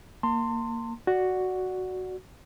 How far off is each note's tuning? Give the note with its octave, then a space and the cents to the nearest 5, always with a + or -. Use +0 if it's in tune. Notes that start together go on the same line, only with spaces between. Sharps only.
A#3 -10 A5 +45 C6 +0
F#4 +0 D5 +0 F#5 +0